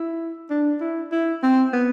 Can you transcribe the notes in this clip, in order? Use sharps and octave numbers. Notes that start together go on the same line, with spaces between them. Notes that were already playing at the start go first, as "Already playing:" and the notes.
Already playing: E4
D4
E4
E4
C4
B3